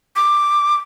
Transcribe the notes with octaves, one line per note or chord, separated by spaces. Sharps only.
D6